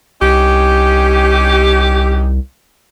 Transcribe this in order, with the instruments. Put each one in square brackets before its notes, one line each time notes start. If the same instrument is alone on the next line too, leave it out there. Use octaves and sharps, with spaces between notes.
[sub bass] C2 [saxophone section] C#4 D#4 G4